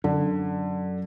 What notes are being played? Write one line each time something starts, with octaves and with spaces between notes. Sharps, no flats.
F#2 D3